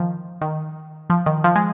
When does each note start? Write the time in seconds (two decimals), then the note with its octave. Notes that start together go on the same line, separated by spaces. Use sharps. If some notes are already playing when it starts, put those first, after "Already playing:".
Already playing: D#3 F3
0.41 D#3
1.10 F3
1.26 D#3
1.44 F3
1.56 G#3